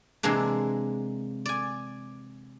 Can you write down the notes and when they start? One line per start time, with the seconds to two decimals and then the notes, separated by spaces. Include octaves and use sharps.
0.23 C3 E3 G#3 A#3 D4
1.46 D5 G#5